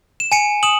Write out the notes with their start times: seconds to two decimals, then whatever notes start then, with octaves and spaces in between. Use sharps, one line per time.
0.20 E7
0.32 G#5 C#7 D#7
0.63 D#6 E7 F#7